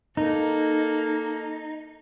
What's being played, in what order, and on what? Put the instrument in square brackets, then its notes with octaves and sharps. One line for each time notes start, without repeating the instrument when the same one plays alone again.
[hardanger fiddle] A#3 A4 [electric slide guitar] D#4